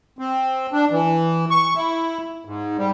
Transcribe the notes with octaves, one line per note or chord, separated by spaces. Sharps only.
C4
D4
E3
C#6
E4
G#2
G3